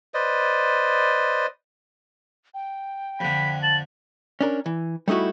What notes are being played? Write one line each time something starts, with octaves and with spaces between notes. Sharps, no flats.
B4 C5 D5 D#5
G5
F2 D3 B5
A5 F#7
C#4 D4 A#4
E3
G3 A3 D#4 E4 F#4